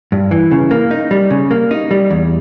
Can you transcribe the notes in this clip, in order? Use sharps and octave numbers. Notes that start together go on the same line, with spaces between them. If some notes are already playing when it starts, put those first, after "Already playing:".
G2
E3
C#3
A#3
D#4
G3
C#3
A#3
D#4
G3
E2